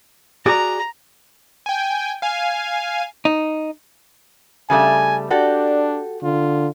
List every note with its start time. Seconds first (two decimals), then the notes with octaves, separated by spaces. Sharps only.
0.46 F#4 G#4 D5 A#5
1.66 G5 G#5
2.22 F5 G#5
3.25 D#4
4.70 C#3 G3 A3 G#5
5.30 D4 F#4 G4 A4 D5
6.23 D3 F4